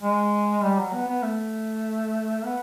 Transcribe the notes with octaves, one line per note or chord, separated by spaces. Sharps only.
G#3
G3
F#3
B3
B3
A3
B3